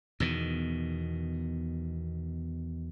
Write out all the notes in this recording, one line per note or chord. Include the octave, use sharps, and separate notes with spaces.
E2 B2 D#3